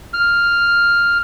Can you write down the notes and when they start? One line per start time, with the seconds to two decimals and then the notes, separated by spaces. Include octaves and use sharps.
0.13 F6